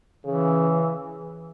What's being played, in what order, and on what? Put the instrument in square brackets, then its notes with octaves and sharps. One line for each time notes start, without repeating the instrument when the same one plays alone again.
[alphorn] C#3 [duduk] E3